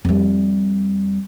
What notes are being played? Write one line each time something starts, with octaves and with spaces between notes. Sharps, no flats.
F2 G3